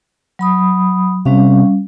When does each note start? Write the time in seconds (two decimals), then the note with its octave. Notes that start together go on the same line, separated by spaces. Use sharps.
0.39 F#3 B5 D#6
1.25 C3 G3 C#4 F5